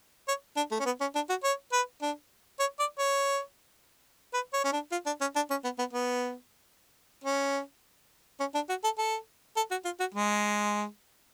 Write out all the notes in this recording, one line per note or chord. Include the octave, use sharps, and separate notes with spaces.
C#5
D4
A3
C#4
B3
C#4
D4
F#4
C#5
B4
D4
C#5
D5
C#5
B4
C#5
C#4
D4
F4
D4
C#4
D4
C#4
B3
B3
B3
C#4
C#4
D4
F#4
A4
A4
A4
F#4
F4
F#4
G#3